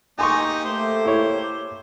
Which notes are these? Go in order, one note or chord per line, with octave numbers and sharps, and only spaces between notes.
A#3 D#4 G4 G#5 C6 C#6
A3 C5
E4 C#5